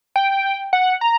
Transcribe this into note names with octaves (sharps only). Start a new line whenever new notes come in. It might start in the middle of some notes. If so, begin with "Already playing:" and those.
G5
F#5
A#5